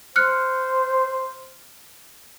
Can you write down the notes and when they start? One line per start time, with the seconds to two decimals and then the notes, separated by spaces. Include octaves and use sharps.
0.16 C5 F6 F#6 C#7